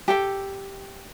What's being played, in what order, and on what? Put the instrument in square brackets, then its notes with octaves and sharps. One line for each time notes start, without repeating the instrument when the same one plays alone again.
[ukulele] G4 A4 G5